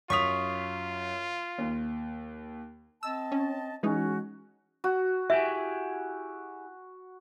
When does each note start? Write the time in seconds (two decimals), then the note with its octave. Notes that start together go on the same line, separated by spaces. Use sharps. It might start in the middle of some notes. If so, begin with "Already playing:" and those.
0.10 F#2 F4 C#6 D#6 B6 F7
1.58 D#2
3.03 C4 D#5 A5 E6
3.32 C#4
3.83 E3 G#3 C#4 D#4 F#4
4.84 F#4
5.30 E4 G4 G#4 E5